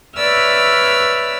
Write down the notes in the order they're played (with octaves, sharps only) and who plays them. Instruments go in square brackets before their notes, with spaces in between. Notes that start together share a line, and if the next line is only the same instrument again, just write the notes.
[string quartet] B4 C#5 D5 E5 E6 F6